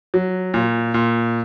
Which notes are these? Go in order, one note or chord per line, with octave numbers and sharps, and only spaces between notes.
F#3
A#2
A#2